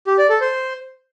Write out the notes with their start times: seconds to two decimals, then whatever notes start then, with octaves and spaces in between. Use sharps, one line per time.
0.07 G4
0.18 D5
0.30 A4
0.41 C5